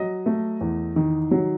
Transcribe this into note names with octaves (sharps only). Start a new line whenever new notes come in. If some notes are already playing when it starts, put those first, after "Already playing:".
Already playing: F#3 D#5
A3
E2
D#3
F#3